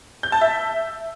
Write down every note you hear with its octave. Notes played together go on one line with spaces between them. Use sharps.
G6
A5
E5